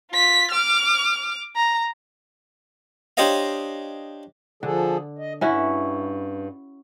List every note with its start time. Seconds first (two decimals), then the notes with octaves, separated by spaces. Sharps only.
0.11 F4 B6
0.51 D6 F6
1.56 A#5
3.17 D4 G4 C5 C#5 D#5 F5
4.63 D3 F3 G#4 A4
5.18 D#5
5.41 G2 C#4 E4 F#4